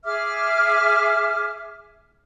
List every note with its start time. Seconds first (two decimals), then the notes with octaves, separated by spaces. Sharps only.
0.04 G#4 E5 D6 F6